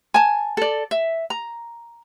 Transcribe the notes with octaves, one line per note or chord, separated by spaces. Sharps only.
G#5 A5
A4 D5
E5
A#5